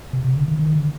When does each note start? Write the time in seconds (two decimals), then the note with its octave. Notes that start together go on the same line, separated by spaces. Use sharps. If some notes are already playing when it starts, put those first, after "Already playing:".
0.13 C3
0.24 C3
0.36 D3
0.48 D#3
0.59 D#3
0.75 D3